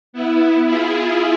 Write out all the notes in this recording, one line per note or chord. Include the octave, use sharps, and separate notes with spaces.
B3 E4
E4 F4 G#4